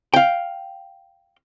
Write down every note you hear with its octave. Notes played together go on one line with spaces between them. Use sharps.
F5 G5